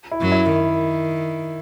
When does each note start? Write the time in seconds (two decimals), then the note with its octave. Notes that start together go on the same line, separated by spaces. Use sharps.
0.11 E4
0.21 F#2 F#3
0.32 E4
0.51 D#3